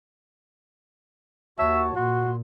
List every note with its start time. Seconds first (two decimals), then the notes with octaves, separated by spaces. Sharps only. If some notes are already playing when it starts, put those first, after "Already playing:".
1.59 D#2 F#4 C#5 E5 A5
1.95 A#2 F#4 C6